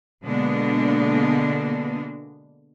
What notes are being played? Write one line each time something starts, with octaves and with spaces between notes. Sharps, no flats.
B2 D3 G#3 A#3 B3 D4